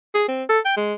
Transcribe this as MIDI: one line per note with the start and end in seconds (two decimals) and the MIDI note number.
0.15 0.26 68
0.28 0.43 60
0.49 0.59 69
0.65 0.75 79
0.77 0.94 56